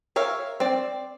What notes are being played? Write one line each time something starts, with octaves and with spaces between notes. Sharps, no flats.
A#4 C#5 E5 F5
C4 D5